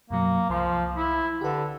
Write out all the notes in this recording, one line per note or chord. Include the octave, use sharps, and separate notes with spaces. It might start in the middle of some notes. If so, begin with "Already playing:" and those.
F#2 B2 F#3 A#3
C2 F3 C6
E4
D3 G4 B4